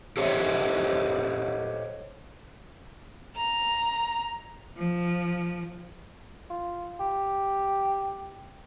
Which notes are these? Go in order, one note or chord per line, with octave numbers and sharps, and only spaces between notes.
G4 A4 C5 C#5 D#5 E5
A#5
F3
F4
G4